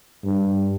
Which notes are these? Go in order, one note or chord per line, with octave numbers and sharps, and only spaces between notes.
G2